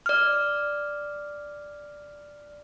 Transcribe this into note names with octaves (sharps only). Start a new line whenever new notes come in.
D5 F6